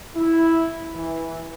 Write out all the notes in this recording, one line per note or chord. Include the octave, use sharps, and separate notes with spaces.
E4
E3